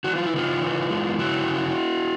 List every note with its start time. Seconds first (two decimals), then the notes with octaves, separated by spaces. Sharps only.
0.04 E3 F#4
0.15 F4
0.26 E4
0.33 C#3 D#4 F4
0.62 E3
0.90 G#3
1.18 C#3 E4 F#4
1.47 C#3